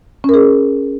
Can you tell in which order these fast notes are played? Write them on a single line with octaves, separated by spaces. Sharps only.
C#4 A#4 G#4